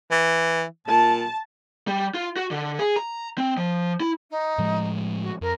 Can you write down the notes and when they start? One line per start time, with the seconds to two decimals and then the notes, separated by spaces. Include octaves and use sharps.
0.11 E3
0.88 A#2 A5
1.87 G3
2.14 F4
2.36 F#4
2.51 D3
2.79 G#4
2.96 A#5
3.38 C4
3.57 F3
4.00 E4
4.30 D#4
4.58 A2 F3 G#3
5.21 F#4
5.41 F2 A#4